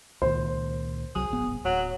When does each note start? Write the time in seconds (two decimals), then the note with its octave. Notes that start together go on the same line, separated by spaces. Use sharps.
0.22 C#2 A#2 D#3 C5
1.15 C2 F#3 G#4
1.30 D1 G#1 B3
1.65 D1 F#3